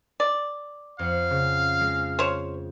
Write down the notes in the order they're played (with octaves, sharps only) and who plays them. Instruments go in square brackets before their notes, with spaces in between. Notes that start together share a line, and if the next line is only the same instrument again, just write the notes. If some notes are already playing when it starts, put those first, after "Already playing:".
[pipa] D5
[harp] F2 F#5 [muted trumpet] F5
[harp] C#3
G#3
[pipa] C5 C#5